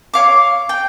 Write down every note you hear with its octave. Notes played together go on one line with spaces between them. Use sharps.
C#5 F5 D6
G5